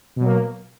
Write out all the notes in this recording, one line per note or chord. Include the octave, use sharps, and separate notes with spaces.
B2 F#3 A#3